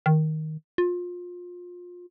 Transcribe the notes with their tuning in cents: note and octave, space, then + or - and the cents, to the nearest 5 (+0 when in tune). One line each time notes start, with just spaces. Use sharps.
D#3 +5
F4 +25